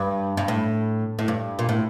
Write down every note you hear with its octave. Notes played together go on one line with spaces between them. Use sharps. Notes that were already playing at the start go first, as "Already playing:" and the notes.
Already playing: G2
G2
A2
A2
G2
A#2
A2